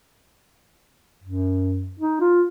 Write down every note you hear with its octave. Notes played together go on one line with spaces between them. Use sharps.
F#2
D#4
F4